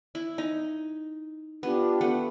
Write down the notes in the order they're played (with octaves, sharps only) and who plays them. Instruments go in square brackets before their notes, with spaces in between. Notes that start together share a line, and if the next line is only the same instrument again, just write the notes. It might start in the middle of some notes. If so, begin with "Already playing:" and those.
[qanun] E4
D#4
[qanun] B3 [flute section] D4 F4 G4
[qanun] A3 B3 F#5